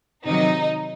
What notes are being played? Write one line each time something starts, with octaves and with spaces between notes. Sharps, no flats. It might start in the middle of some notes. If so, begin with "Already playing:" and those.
C3 D#3 F#3 D#4